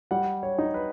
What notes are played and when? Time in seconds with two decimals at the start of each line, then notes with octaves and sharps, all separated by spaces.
0.11 G3 F#5
0.43 C#5
0.59 D#4
0.74 B4